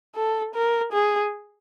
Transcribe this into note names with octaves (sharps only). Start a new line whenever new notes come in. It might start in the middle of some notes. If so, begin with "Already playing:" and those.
A4
A#4
G#4